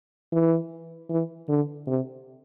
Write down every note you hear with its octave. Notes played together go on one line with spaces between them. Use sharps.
E3
E3
D3
C3